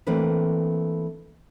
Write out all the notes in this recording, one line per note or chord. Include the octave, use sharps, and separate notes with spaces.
E3 A3 A#3 C4 D4 B4